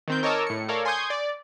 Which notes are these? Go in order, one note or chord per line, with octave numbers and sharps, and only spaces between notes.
D#3 C4 G6
A#4 C#5 D#5 A5 D6 E6
A2 C#7
A4 A#4 C#5 D5 F5
G#5 C6 C#6 D#6 G6 G#6
D5